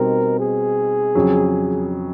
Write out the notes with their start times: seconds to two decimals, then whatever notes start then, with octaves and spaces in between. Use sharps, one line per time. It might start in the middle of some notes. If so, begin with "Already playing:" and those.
Already playing: B2 G3 C4 D#4 A#4
0.40 G#4
1.15 F2 C#3 F#3